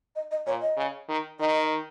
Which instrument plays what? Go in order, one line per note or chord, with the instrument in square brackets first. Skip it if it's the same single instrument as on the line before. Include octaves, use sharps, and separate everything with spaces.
[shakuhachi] D#5
D#5
[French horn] A#2 [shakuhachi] C#5
[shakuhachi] D#5
[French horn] C#3
D#3
[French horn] D#3 [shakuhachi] D#5